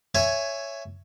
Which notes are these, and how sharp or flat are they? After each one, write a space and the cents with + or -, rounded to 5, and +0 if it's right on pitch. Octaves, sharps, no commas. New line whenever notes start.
C#5 +5 E5 +15 G#5 +0